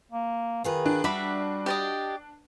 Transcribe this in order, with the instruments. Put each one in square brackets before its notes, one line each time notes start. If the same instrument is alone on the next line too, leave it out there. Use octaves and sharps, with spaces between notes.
[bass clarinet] A#3
[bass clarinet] D#3 [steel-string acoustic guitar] F4 G#4 B4
[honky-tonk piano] D4
[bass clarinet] G3 [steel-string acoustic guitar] F#4 [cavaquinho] D5 E5 B5
[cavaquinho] G4 D5 D#5